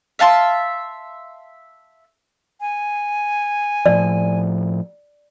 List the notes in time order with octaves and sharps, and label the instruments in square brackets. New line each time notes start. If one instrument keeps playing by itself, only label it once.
[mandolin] E5 F5 A5 C6
[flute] G#5
[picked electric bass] A2 F3 [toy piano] D5